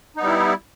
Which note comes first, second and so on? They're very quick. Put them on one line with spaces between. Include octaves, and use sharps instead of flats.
D#4 B3 G3 E4